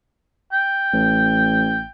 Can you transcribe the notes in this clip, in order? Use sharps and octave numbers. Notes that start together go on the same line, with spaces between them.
G5
A1